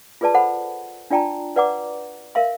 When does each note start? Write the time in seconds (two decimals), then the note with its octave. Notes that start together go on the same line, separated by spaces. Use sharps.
0.21 F4 G#4 B4 D5 A5
0.34 A4 C5 F#5 B5
1.10 D4 F4 D5 G5 A5 A#5
1.56 F#4 B4 D5 F#5 A#5 D6
2.35 A#4 E5 F5 C6